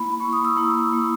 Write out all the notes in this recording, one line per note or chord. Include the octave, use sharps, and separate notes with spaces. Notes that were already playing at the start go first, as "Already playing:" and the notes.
Already playing: A#3 E4 B5
A#3 E4 C#6
D#6
E6
A#3 E4
A#3 E4